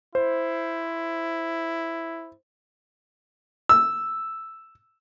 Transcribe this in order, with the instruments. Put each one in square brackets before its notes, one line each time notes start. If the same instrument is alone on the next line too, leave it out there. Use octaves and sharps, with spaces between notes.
[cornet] E4 [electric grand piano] C5
[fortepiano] E6